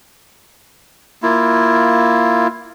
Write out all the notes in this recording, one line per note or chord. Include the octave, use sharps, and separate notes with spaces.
A#3 E4 F4